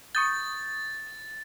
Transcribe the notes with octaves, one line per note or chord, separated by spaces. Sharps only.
C#6 D#6 G6 A6